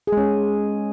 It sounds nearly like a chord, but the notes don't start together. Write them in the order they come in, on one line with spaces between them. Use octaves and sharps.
G#4 G#3 C#4